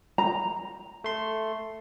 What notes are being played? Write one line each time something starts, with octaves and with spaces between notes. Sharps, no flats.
A#5
A3 C6